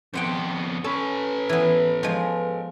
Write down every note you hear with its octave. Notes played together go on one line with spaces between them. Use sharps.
F2 B3 C5 F#5 G5
C#4 A4 B4
E3 B3
F3 G#3